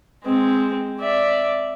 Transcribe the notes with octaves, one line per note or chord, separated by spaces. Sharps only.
G#3 C4
D5 E5